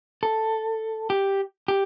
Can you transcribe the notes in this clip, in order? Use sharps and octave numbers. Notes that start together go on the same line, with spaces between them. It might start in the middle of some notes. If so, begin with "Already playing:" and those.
A4
G4
G4